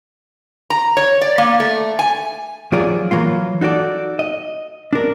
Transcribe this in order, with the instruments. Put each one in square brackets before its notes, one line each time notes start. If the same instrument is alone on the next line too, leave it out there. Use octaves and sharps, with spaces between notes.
[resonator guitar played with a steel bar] A#5
C#5
D5
A#3
A3
G#5
[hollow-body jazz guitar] F3 F#3 F4 G#4 D5
E3 F#3 A#3 F4
D#4 F#4 A4 D5
D#5
D4 A#4